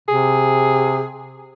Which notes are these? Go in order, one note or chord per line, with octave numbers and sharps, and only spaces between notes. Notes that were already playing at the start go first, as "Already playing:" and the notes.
C3 G#4